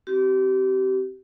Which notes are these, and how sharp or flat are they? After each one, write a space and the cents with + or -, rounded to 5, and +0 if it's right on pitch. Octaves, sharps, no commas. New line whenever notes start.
C4 +0 G4 -30